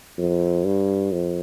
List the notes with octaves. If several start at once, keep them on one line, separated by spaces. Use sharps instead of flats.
F2
G2
F2